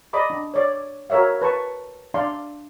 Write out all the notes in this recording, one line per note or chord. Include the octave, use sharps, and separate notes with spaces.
D5 D#5 B5 D6
D4
C#5 D5
F#4 A#4 C#5 E5 F5
B4 A5 C#6
D4 D5 F5 C6